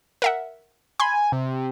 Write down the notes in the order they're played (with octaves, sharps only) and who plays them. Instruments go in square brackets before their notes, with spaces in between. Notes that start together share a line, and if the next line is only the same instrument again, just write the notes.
[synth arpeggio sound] A#4 E5 F#5
[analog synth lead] G#5 [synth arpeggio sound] B5 C6
[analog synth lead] C3